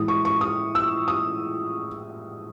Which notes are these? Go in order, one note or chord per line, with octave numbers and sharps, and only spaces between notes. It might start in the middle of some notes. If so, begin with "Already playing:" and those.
Already playing: A2 E3 G#3 D#6
C#6
C#6
D#6
E6
D#6